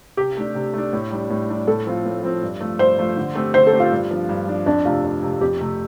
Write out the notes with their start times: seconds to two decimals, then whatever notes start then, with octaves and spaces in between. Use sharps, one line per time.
0.17 C3 G4
0.37 A3 D4
0.55 C3
0.73 A3 D4
0.93 A2
1.11 G3 D4
1.30 A2
1.49 G3 D4
1.67 A2 A4
1.86 F3 C4 F4
2.05 A2
2.23 F3 C4 F4
2.43 G2
2.61 F3 A3 F4
2.79 G2 C5
2.98 F3 A3 F4
3.17 D3
3.35 A3 C4 G4
3.54 D3 C5
3.67 A4
3.72 A3 C4 G4
3.80 F4
3.91 G2
4.10 F3 D4
4.29 G2
4.48 F3 D4
4.66 F2 D4
4.85 C3 A3 F4
5.04 F2
5.22 C3 A3
5.41 F2 G4
5.60 C3 A3